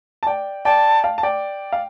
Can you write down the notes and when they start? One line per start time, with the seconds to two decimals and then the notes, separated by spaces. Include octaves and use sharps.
0.23 A5
0.27 D5 G5
0.65 D5 G5 A5
1.04 F5 A5
1.18 A5
1.23 D5 G5
1.72 F5